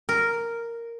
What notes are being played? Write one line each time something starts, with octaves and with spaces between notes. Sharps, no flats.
A#4